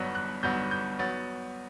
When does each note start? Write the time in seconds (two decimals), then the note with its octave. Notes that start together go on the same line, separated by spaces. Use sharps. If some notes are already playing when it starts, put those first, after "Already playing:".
Already playing: G1 G2 F#3 B3 F#6
0.15 F#6
0.43 G1 G2 F#3 B3 G6
0.71 G6
0.99 F#3 B3 A6